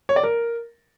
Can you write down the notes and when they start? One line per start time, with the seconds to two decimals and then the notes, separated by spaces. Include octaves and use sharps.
0.09 C#5
0.16 D5
0.23 A#4